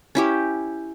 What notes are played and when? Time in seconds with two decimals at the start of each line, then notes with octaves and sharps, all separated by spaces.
0.15 C#4 E4 G4